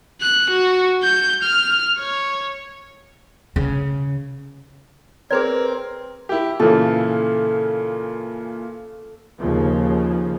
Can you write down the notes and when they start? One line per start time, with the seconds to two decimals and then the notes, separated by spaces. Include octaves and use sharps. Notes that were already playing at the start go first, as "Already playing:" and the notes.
0.21 F#6
0.50 F#4
1.04 G6
1.43 F6
2.00 C#5
3.56 C#3
5.31 C4 G#4 A#4 B4 D5
6.29 E4 G4
6.60 A#2 C#3 E3 A4
9.38 D#2 C#3 F3